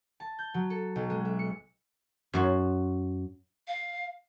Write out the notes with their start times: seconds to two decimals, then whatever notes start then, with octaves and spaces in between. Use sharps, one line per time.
0.20 A5
0.39 G6
0.54 F#3
0.70 A4
0.96 B1
1.10 G#3
1.25 E5
1.39 C#7
2.33 F#2 F#4 C6
3.68 F5